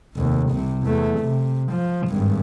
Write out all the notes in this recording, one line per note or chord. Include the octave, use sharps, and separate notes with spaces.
F1 D#2
C2 C3
E2 A3
C3
F3
G#1 G2